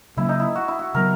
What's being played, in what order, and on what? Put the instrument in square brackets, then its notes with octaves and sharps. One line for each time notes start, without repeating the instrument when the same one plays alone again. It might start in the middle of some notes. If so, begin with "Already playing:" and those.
[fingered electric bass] C#3 F#3 A#3 C#4 [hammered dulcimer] E4
[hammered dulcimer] D#4
E4
F#4
E4
F#4
[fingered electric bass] C#3 F#3 B3 [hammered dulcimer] A#4